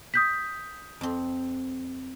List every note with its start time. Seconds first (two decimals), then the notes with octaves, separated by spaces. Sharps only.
0.14 D#6 G6 B6
1.01 F2 C4